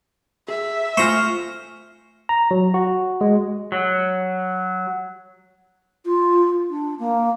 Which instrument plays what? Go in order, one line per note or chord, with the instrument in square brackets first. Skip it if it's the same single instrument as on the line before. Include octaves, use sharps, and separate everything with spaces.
[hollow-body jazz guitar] G#4 [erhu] E5
[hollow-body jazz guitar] A3 F4 G#5 [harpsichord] C5 A#5 [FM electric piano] C#6 F6
[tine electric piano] A#5
F#3
F#4
G#3
[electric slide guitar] F#3
[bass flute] F4
D4
A#3